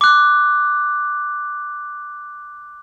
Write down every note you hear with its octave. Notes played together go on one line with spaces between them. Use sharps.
D6 F#6